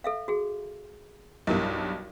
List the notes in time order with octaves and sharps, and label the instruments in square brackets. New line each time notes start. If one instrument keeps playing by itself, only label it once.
[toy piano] A4 E5 F5
F#4 G#4
[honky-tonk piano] B1 G2 [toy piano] E4 G4 A#4